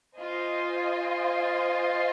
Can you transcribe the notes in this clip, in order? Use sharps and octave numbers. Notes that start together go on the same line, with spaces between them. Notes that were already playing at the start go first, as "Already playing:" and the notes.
F4 C5 D#5 G#5